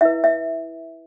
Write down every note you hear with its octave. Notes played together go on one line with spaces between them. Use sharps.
E4 B4 E5
E5